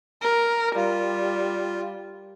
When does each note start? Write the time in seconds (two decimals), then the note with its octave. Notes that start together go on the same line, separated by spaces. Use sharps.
0.22 A#4
0.76 G3 F4